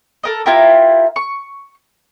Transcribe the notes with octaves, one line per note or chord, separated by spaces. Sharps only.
A4 A#4 D#5
E4 F4 G4 A#4
C#6